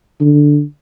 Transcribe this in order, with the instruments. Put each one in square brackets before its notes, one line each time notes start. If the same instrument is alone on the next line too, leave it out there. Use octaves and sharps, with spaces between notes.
[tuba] D3